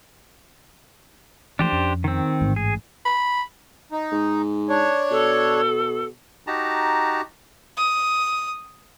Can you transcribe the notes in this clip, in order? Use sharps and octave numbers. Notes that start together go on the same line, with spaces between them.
E3 F3 A3 D4 G4 C5
F2 C#4
D#3 C4
A1 G#2
G#4
B5
D#4
G#2
D4 C#5
B2 A4
D#4 F#4 G4 A5 A#5
D#6